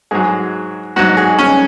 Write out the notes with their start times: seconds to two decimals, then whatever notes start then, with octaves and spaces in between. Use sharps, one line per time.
0.11 G#2 F#3 G#4
0.96 G#2 F#3 F#4
1.17 G#4
1.39 C#4